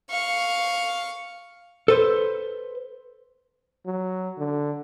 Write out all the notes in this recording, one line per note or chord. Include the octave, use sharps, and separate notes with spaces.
F5 C#6
A4 B4 C5
F#3
D3